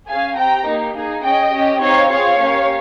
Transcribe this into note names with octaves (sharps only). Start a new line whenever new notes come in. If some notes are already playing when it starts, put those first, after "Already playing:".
C#4 G#4 F5 G#5
C4 G4 G5 A#5
A#3 D#4 G4
A#3 D#4 G#4
C#4 G#4 D#5 G5
C#4 G4
C4 D#4 G4 C#5 F5
C4 F4 G#4 C#5 F5
A#3 C#4 G4